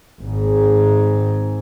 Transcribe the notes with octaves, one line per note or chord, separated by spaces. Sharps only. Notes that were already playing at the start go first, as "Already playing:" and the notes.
G#1 G#2